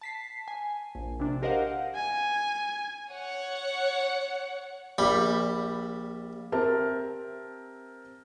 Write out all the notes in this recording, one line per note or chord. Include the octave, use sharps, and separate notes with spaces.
A5 B6 C7
G#5
A#1
C3 D4
G4 A#4 C5 D#5 F5 F#5
G#5
C#5 F#5
A#1 G3 B5
C4 G4 A#4 E5 A5